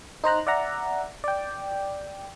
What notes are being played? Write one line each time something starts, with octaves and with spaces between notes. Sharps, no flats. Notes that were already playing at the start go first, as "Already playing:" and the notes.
D#4 C5 A#5 F#6
D5 E5 F#5 A#5
D5 G5